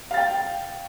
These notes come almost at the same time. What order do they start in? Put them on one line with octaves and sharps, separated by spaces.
F5 A6 G5